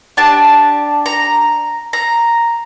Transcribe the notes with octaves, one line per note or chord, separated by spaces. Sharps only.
D4 G4 A5
A#5
A#5